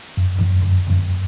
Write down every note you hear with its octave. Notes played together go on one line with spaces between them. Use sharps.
F#2
F#2
F#2
F#2